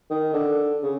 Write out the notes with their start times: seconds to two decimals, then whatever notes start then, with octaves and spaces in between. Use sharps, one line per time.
0.10 D#3
0.33 D3
0.83 C#3